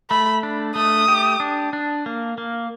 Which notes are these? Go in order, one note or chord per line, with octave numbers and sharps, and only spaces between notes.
A3 B5
D4
A3 D#6
G4
D4
D4
A#3
A#3